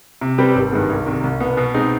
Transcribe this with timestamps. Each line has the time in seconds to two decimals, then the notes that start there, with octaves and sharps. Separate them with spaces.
0.21 C3
0.38 G3 C4 G4 B4
0.56 G#1
0.72 G2 D#3 G#3 B3
0.90 C2
1.06 C3 D#3
1.24 C2
1.40 B2 B3
1.57 B2
1.74 G#3 C4 D#4